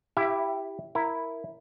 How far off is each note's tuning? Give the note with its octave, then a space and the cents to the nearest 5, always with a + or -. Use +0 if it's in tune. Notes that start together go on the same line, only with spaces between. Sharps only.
E4 +0 G4 +0 E5 +30
E4 +0 A#4 +0